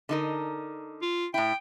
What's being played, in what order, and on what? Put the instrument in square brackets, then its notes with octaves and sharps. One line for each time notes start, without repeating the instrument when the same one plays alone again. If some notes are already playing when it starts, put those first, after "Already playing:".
[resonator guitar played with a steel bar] D3 D#4 A#4
[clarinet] F4
[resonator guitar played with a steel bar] A2 E4 [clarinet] G5